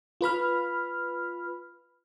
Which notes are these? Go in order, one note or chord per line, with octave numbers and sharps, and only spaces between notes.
F4 B4 B5 F6